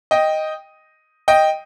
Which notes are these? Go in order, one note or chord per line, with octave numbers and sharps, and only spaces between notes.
D#5 G5
D#5 G5